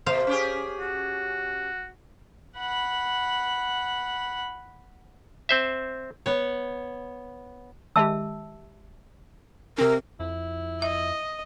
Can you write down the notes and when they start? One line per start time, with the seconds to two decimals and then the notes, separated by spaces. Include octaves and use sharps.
0.06 B2 C5 F5
0.27 C#4 G4 G#4
0.80 F#4
2.57 F#5 B5
5.49 C4 C5 E5
6.26 B3 C#5
7.96 D#3 G#3 G4 E5 A5 E6
9.78 C3 C4 A#4
10.20 F2 E4
10.82 D#5 E5